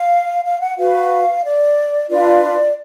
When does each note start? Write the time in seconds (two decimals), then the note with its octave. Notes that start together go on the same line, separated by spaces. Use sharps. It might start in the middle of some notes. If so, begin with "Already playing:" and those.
Already playing: F5
0.44 F5
0.60 F#5
0.77 F#4 B4 F5
1.44 D5
2.10 D4 F4 B4 D5